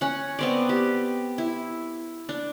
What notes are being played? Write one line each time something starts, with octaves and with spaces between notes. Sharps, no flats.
C#4 F#5
B3 C4 D5
G4
E4
D4